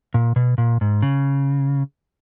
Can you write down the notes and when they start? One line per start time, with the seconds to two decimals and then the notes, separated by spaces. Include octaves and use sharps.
0.14 A#2
0.36 B2
0.58 A#2
0.81 G#2
1.02 C#3